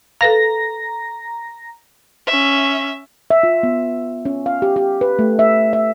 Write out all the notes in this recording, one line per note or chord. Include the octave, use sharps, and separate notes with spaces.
A4 B4 F5 A#5 A#6
C#4 E5
E5
F4
B3
C#4
F5
G4
G4
B4
A3
E5
E5